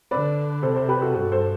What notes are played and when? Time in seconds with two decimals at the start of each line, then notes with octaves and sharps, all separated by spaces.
0.11 D3 B4 D5
0.62 C3 A4 C5
0.76 A4 C5
0.88 G4 B4
1.02 F#4 A4
1.14 G2 F#4 A4
1.32 A4 C5